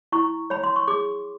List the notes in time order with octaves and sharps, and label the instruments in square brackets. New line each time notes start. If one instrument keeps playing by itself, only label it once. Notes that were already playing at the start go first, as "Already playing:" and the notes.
[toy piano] E4 C#6
C#5 B5
C6
C#6
G#4 D6